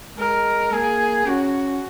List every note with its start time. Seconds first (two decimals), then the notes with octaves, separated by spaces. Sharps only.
0.18 G#3 A#4
0.72 A#3 G#4
1.25 C#4 F#4